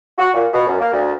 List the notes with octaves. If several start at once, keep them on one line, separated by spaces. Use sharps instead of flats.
F#4
A#2
B2
F#2
A#3
D2